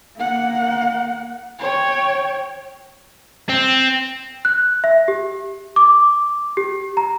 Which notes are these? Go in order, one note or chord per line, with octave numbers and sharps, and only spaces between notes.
A#3 F#5
C#5 G5
C4
F#6
E5
G4
D6
G4
A#5